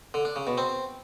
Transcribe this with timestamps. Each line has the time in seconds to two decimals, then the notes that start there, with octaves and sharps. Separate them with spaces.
0.14 D3
0.25 D4
0.36 C#3
0.47 B2
0.58 C4